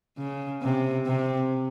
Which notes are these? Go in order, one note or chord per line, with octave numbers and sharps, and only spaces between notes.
C#3
C3
C3